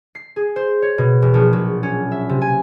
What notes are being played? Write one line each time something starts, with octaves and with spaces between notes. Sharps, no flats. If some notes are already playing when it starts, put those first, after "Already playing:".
C7
G#4
C5
C#5
B2
E1
A#1
F#3
C#4
E5
C3
G#5